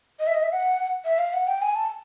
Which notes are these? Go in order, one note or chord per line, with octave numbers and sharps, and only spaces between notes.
D#5
E5
D#5
E5
F#5
E5
F5
F#5
G5
G#5
A5